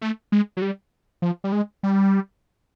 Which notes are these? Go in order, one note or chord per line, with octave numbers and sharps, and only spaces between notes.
A3
G#3
F#3
G3
F3
G3
G#3
G3